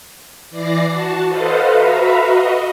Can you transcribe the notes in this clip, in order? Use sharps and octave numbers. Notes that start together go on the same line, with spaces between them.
E3 D5 D6 A#6 C7
F#4 A5
A4 B4 C5 D#5 F5 F#5
F#4 B4 E5 F5 A#5 B5
F#4 D#5